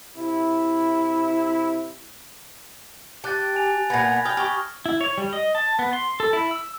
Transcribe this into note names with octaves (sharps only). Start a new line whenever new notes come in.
C3 E4
G4 A5 F#6 A6
G#5 F7
A#2 B3 B5 G#6 A#6
G5 B5 D#6 F6
G4 C#6 F6
E4
C#5
G3
D#5
A5
B3
C6
A4
E4
E6